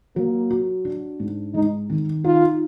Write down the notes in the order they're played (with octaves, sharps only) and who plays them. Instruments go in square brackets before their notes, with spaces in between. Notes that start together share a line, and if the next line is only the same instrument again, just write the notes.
[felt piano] F#3 [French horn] A#3
[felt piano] F#4
D4
G#2
[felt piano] G#3 [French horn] D#4
[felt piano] D#3
[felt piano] D#4 [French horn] F4